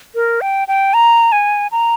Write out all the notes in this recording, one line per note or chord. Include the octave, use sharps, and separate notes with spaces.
A#4
G5
G5
A#5
G#5
A#5